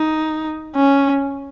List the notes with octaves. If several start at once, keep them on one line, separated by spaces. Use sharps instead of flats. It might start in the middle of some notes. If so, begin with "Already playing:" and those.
Already playing: D#4
C#4